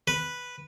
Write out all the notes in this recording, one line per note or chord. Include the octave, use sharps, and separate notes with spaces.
B4